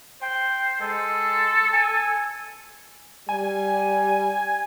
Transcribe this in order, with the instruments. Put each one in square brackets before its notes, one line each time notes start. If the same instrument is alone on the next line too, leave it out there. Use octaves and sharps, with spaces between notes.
[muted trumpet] C5 [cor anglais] G5
[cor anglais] G#3 [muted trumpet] A4
[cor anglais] G#5
[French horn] G3 [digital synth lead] G#5